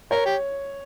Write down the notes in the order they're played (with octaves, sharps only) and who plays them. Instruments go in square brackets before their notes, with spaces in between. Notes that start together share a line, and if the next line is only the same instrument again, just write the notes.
[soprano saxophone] A#4 [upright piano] C#5
[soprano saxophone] G4